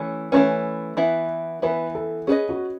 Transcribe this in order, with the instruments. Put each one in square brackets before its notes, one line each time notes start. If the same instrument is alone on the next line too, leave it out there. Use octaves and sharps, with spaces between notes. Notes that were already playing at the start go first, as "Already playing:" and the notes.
Already playing: [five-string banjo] E3 A3 C#4
[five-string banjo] E3 A3 C#4 [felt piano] B4
[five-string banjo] E3 B3 E4
[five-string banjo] E3 B3 E4 [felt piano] B4
[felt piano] A4
[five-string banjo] C#4 E4 B4 D#5 [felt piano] G#4
[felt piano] F#4